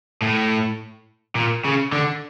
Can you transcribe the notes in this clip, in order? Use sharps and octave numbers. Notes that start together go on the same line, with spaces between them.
A2
A#2
C#3
D3